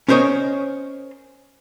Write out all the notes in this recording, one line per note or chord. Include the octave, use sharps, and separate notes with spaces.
C#4 A#4 C5 C#5 D#5